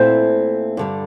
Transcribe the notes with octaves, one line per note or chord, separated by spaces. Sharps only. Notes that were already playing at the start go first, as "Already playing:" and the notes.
Already playing: A#2 A3 C4 E4 C5
G2 D3 G3